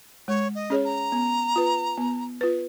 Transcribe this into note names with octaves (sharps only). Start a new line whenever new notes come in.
G#3 C#5
D#5
C#4 G#4 C#5
A#5
B3
F4 B4
B3
F4 B4